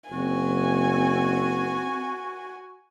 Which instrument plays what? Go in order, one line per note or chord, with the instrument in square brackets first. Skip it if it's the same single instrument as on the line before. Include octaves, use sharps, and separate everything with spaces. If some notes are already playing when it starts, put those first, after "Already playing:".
[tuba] F#1 [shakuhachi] C4 [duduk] F#4 [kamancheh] G#5